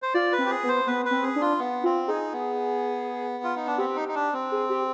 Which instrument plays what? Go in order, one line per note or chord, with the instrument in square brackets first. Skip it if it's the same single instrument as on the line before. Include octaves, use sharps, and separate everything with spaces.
[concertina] C5
[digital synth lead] F4 [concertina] D5
[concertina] B4
[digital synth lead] C4
[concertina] G4
G#4
[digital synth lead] B3
[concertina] C5
[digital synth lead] B3 [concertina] B4
[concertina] B4
[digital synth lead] C4
[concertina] G#4
[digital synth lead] D4
[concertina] F4
B3
[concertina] C4 [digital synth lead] F4
[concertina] D#4 [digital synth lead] G#4
[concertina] B3
F4
D#4
D4
[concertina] C4 [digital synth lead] G4
[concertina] D#4
D#4
D4
C4
[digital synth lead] G#4
G4